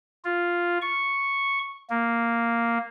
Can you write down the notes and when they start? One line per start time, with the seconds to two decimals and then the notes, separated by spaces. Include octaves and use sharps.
0.25 F4
0.82 C#6
1.90 A#3